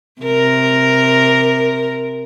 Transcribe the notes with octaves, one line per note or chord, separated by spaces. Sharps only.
C3 A#4